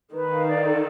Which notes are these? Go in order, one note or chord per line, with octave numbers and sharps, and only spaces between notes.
D#3 B4
F5
D5
A4